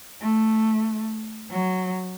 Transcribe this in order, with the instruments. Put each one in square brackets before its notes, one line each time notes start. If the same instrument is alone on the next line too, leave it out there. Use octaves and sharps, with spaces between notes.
[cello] A3
F#3